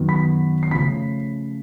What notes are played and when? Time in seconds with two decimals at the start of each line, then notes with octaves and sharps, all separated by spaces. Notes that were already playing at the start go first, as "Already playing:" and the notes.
Already playing: F#2 D#3 F#3 B3
0.08 B5 B6
0.63 C7
0.71 C#3 F3 A3 C#4 B5 B6